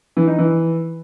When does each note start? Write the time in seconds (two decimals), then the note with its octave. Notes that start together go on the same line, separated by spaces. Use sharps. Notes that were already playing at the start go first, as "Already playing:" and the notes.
0.17 E3
0.27 D#4
0.38 E3